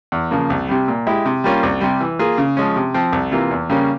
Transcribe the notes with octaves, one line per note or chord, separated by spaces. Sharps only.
E2
C#3 F3 A#3
C2
C3 G3
A#2
G#3 E4 G4
C3
G3 A#3 C#4 F4
C2
C3 G3
E3
A#3 F4 G#4
C#3
F3 G#3 C#4
C3
F3 C4
C2
C3 E3 A#3 F4
E2
C#3 G3 A#3 C#4